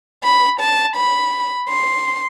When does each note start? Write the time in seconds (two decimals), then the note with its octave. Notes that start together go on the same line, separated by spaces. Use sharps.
0.23 B5
0.60 A5
0.96 B5
1.69 C6